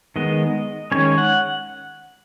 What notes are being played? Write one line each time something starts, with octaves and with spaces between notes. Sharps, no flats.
D#3 G#3 B3 D#5
D#3 G#3 C#4 C#5
F#5